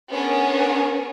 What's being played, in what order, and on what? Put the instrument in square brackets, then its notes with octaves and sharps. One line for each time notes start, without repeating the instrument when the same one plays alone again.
[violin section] B3 C#4 D4 G#4 A#4 C#5